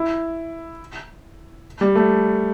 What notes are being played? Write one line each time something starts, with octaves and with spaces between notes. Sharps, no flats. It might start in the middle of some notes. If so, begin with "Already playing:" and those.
Already playing: E4
G3
A3